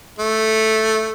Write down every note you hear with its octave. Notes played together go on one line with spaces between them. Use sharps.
A3